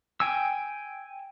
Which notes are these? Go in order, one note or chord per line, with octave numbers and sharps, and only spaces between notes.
G5 G#5 E6